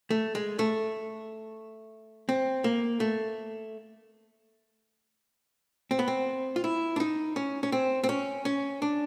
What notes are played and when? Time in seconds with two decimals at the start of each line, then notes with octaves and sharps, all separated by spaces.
0.10 A3
0.35 G#3
0.59 A3
2.29 C4
2.64 A#3
3.00 A3
5.91 C4
5.99 B3
6.08 C4
6.56 F4
6.64 E4
6.96 D4
7.00 D#4
7.36 C#4
7.63 C#4
7.72 C4
8.04 C4
8.09 C#4
8.45 C#4
8.82 D4